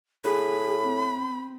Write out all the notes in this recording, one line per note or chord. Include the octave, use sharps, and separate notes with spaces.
A2 G#4 B5
C4